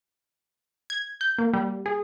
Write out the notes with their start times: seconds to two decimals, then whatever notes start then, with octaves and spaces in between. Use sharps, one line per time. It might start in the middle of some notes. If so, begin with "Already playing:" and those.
0.90 G#6
1.21 G6
1.38 A#3
1.54 G3
1.86 G#4